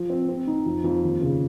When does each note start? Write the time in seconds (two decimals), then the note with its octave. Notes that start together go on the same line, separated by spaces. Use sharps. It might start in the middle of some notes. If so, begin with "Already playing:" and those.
Already playing: F3
0.10 C4
0.29 C4
0.47 D#4
0.66 F2
0.84 F2
1.03 D#2
1.21 C#3